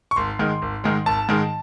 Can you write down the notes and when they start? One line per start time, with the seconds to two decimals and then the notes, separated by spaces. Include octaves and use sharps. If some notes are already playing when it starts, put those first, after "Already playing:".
0.11 C#6
0.16 G#1 C6
0.39 G#2 D#3 G#3
0.62 G#1
0.84 G#2 D#3 G#3
1.06 G#1 A5
1.29 G#2 D#3 G#3